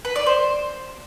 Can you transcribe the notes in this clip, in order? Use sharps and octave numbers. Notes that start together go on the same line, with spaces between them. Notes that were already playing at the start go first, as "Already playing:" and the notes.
B4
D5
C5